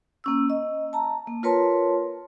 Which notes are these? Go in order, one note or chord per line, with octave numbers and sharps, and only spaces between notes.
A#3 C#4 E6
D#5
A5 A#5
A#3
F4 A#4 B4 C#5 A5 C6